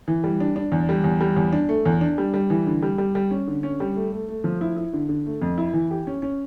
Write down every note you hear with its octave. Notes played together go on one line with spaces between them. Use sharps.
E3
G3
D4
D4
E2
G3
E2
G3
E2
D4
A3
E2
D4
G3
G3
E3
D3
G3
G3
G3
C#4
D3
C#4
G3
A3
A3
A3
F3
E4
E4
D3
D3
A3
F2
E4
E3
G4
C#4
C#4